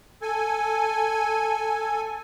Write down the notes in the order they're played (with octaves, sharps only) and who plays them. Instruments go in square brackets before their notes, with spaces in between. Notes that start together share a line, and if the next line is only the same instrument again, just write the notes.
[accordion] A4 G#5